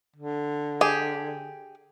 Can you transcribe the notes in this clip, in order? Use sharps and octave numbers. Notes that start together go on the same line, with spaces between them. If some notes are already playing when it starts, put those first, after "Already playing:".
D3
G4 G#4